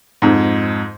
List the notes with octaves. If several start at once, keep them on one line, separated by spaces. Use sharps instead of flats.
F2 G#2